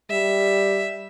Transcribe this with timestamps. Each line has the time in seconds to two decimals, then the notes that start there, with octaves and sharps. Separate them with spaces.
0.10 G3 E5